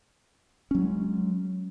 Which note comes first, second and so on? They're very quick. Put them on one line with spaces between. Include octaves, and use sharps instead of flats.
C#4 F#3 A#3 G#3